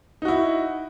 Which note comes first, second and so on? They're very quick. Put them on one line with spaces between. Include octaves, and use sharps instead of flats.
D#4 F#4 E4